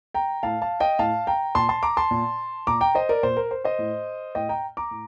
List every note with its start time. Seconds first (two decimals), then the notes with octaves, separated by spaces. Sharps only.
0.14 G5 A#5
0.43 A2 F5 A5
0.62 F5 A5
0.80 D#5 G5
0.99 A2 F5 A5
1.27 G5 A#5
1.55 A#2 A5 C6
1.69 A5 C6
1.83 A#5 D6
1.97 A5 C6
2.11 A#2
2.67 A#2 A#5 D6
2.81 G5 A#5
2.95 C5 D#5
3.09 A#4 D5
3.23 A#2 C5
3.37 A#4
3.51 C5
3.64 C5 D#5
3.79 A2
4.35 A2 D#5 G5
4.49 G5 A#5
4.77 A#5 D6
4.91 A2